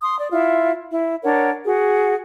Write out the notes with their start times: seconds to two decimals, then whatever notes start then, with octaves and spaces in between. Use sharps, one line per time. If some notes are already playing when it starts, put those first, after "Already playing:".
0.02 C6 D#6
0.18 D5
0.31 E4 F4 E5
0.89 E4
1.23 D4 A#4 C#5 F#5
1.65 F#4 G#4